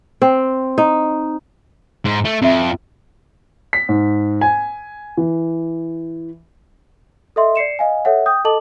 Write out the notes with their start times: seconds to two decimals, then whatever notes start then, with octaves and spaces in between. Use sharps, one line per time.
0.22 C4
0.78 D#4
2.05 G#2
2.25 A3
2.42 F2 C4 E5
3.73 B6
3.89 G#2
4.41 G#5
5.17 E3
7.36 A4 D#5 E5 C6
7.56 D5 C7 C#7 E7
7.79 D#5 F5 G#5
8.05 A4 C#5 E5 F#5
8.26 G5 D#6 G6
8.45 A4 D#5 A5 D6 F#7